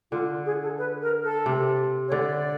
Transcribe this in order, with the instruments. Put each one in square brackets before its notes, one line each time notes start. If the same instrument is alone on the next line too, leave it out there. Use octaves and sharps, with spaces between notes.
[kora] D3 [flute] F4
[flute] G#4
A4
B4
A#4
A4
[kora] C3
[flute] C#5
[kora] D3 [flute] D5